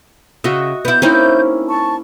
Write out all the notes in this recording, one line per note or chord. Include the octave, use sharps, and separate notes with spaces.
C#3 F#4 D#5 E5
B3 E4 G6
A#3 C4 C#4 D#4 E4
A5 C#6